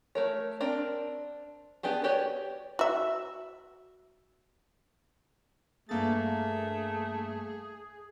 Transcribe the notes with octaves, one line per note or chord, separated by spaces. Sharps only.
A3 A#4 C#5
C4 D4 A#4
B3 D4 G4 G#4
F#4 G4 B4 C#5 D5
F#4 E5
G2 A3 A#3 G#4 A6